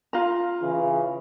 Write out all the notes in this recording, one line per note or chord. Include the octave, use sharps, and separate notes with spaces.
F4 A#5
C#3 E3